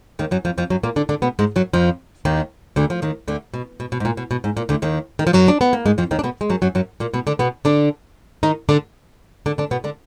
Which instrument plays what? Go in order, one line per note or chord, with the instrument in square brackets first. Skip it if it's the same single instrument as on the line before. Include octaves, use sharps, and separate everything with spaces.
[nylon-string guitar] D#2 D#3
F#2 F#3
F2 F3
F2 F3
F#2 F#3
A#2 A#3
D3 D4
D3 D4
B2 B3
G#2 G#3
F#2 F#3
F2 F3
D#2 D#3
D2 D3
F3
D#2 D#3
D2 D3
B2
B2
B2
G#2
A#2
B2
B2
G#2
A#2
D2 D3
D#2 D#3
D#3
F3
F#2 F#3
D4
B3
A#3
G#2 G#3
F2 F3
D#2 D#3
D4
B2 B3
G#3
F#2 F#3
F#2 F#3
F#2 F#3
A#2 A#3
B2 B3
D3 D4
B2 B3
D3 D4
D#3 D#4
D3 D4
D3 D4
D3 D4
B2 B3
D3 D4